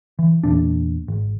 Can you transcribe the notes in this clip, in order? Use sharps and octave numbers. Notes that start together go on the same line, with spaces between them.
E3
E2 A#2 D4
G#1